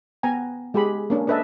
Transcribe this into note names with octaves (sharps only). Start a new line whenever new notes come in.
B3 G5 G#5 A#5
G#3 G4 G#4 B5
A#3 C#4 D4
D4 A4 B4 D#5 E5 A5